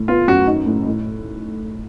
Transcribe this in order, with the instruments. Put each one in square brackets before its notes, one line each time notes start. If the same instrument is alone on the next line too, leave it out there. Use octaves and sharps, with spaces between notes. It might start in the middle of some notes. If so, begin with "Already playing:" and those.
Already playing: [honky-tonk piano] A2
[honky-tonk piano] B3 [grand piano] F4
[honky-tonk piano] F#2 [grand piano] F#4
[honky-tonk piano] D#4
A2
A2